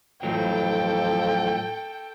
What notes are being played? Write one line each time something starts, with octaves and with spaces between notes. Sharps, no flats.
F2 A2 E3 F#3 A4 G5